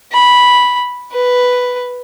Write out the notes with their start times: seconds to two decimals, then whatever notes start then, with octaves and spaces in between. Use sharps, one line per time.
0.12 B5
1.13 B4